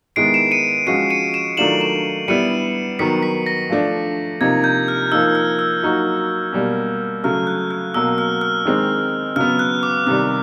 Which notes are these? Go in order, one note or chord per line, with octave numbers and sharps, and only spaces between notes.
D#3 G#3 B3 E4 C7 D7
D7 E7
C#7 D#7
F3 G#3 C#4 F#4 C7 D7
C#7 D#7
D7 E7
D#3 F#3 A3 D4 F4 E7 F#7
E7 F#7
G3 B3 E4 C#7 D#7
D#3 F#3 B3 B6 C#7
B6
A#6
F3 A3 D4
C3 F3 A#3 D#4 G#6
G6
F6
F3 A#3 D#4 E6
F6
E6
F#3 A#3 D#4 F#4
B2 G3 A#3
C#3 F#3 A3 F6
F#6
F6
B2 F#3 A#3 E6
F6
F6
D#3 G#3 C4
C#3 F#3 B3 F6
F#6
D6
C3 D#3 G3 D6